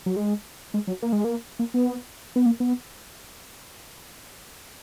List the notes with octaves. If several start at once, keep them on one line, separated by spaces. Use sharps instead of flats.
F#3
G#3
G#3
F#3
A#3
G#3
A#3
A#3
B3
B3
A#3
B3